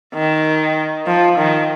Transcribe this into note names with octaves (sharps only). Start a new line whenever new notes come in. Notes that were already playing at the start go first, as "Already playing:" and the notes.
D#3
F3
D#3